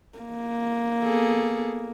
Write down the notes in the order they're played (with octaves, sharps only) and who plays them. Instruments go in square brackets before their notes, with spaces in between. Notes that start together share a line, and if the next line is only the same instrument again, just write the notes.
[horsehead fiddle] A#3
[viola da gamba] B3 G#4 A4